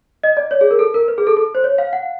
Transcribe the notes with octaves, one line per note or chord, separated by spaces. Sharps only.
D#5
D5
C#5
G#4
A#4
A4
A#4
B4
G#4
A4
A4
C5
C#5
F5
F#5